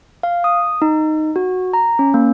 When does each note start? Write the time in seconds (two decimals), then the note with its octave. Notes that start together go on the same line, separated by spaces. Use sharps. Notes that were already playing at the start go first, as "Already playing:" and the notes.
0.23 F5
0.44 D#6
0.82 D#4
1.36 F#4
1.73 A#5
1.99 C#4
2.14 A#3